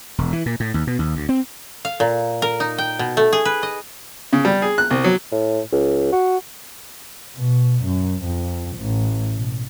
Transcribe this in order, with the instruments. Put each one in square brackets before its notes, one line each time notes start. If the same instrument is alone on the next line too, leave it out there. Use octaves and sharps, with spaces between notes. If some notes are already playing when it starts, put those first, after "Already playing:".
[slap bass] E1
E3
A#2
A2
D#2
B2
D#2
D2
C4
[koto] F5
A#2
A#4
D#4
G5
B2
A3
G#4
B4
D#5
[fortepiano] C#3
G3
G#4
F#6
C2
F#3
[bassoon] A2
C#2
F#4
[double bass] B2
F#2
F2
A1
B2